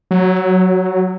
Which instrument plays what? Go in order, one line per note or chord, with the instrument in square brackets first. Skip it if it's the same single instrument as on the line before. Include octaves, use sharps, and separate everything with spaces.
[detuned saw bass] F#3